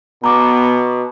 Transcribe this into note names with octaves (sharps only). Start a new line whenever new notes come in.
B2 B3 A#5 D6